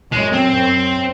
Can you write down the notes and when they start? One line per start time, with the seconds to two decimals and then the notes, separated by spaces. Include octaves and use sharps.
0.11 F#2 G#3
0.33 C4
0.53 F#2